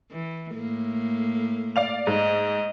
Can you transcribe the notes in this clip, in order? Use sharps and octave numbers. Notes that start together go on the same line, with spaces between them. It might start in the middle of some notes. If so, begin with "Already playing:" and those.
E3
A2 A#3
D5 F5 F7
G#2 D#5